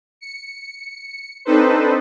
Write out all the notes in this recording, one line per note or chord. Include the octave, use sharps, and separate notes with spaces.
C#7
C4 D4 D#4 A4 B4 C5